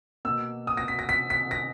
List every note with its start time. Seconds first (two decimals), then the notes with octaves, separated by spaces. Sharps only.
0.25 B2 A#3 E6
0.67 D#6
0.77 A#6
0.88 B6
0.99 A#6
1.09 B6
1.30 B6
1.51 A#6